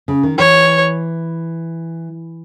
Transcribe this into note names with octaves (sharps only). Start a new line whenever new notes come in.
C#3
D#3
E3 C#5